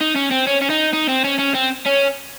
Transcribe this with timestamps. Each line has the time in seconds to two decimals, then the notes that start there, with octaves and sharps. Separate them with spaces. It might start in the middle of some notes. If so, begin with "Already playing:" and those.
0.01 D#4
0.16 C#4
0.31 C4
0.47 C#4
0.62 C#4
0.70 D#4
0.93 D#4
1.09 C4
1.24 C#4
1.39 C#4
1.55 C4
1.86 C#4